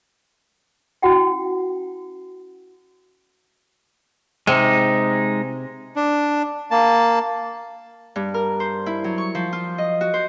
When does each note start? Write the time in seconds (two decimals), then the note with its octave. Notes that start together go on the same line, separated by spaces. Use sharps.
1.02 C#4 E4 F#4 F#5 G5
4.47 C3 G#3 D#4
5.96 D4
6.71 A#3 A5
8.16 G2
8.34 A#4
8.60 C5
8.86 E4
9.04 F#3
9.18 C#6
9.35 F3
9.53 F4
9.78 D#5
10.01 F#4
10.14 C5